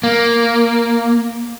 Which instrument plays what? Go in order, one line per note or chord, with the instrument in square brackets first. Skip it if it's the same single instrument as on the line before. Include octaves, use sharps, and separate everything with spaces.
[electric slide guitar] A#3